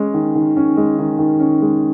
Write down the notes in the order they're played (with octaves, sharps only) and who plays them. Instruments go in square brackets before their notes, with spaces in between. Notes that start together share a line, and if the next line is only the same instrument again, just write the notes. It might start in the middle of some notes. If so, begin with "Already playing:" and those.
Already playing: [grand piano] G#3 C#4
D#3
D#3
C#4
G#3
D#3
D#3
C#4
G#3